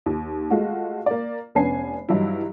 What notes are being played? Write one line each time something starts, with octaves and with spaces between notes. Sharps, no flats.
D#2
G#3 A3 F4 F#4
A#3 D5
F1 B3 C#4 D4 G#5 C7
G2 E3 F#3 D#4 E4